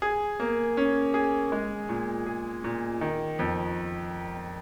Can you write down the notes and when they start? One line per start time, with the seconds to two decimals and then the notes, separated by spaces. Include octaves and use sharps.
0.02 G#4
0.40 A#3
0.77 C#4
1.14 G#4
1.52 G#3
1.89 A#2
2.26 G#4
2.64 A#2
3.01 D#3
3.39 F2